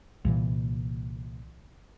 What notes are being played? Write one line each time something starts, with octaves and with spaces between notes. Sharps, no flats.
C2 A#2 E3